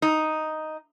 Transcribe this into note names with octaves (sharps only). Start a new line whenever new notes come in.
D#4